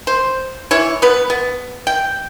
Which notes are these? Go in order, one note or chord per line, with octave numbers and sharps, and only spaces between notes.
C5
E3 E4 C#5
B3 B4
B3
G5